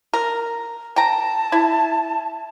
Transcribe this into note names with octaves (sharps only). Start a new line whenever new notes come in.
A#4
G5 A5 A#5
E4